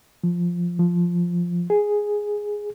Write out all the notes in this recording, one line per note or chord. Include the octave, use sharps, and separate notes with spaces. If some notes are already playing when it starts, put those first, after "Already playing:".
F3
F3
G#4